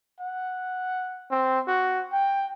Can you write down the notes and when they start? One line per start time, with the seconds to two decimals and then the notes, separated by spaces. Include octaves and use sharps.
0.21 F#5
1.31 C4
1.67 F#4
2.12 G5